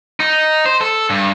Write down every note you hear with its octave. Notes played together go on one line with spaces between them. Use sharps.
D#4
C5
A4
G2